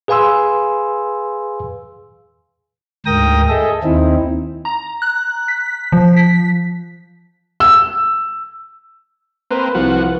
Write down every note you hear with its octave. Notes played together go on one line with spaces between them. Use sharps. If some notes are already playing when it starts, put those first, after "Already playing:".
G#4 B4 F5 G#5 C6 E6
D2 G#2 A#4 G5 D#6 A#6
G#4 A4 D#5 E5
D#2 C4 D#4 E4
A#5
F#6
B6
F3
B6
E6
A#3 C4 B4
C2 F3 F#4